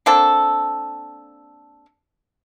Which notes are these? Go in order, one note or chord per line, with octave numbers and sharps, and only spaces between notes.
A#3 C4 D4 A4